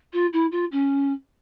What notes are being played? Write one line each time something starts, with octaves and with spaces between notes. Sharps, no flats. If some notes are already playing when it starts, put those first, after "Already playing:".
F4
E4
F4
C#4